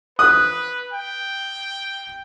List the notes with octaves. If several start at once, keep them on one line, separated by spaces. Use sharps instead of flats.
B4 D#6 F#6
G5